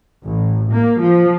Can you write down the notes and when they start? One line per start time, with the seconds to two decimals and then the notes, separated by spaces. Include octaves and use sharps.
0.25 A1
0.72 A#3
1.03 F3